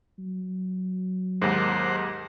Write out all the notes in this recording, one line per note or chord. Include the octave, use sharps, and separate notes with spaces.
F#3
D#2 G#2 A#4 C5 F#5